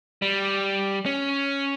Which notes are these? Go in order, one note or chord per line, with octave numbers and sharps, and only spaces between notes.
G3
C#4